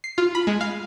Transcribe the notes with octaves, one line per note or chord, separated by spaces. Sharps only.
C7
F4
B5
G#3
F5